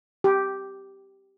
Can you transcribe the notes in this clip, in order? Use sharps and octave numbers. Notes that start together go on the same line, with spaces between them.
G4